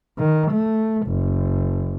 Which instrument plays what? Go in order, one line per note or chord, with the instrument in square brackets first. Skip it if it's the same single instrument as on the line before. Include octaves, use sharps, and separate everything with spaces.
[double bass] D#3
A3
F#1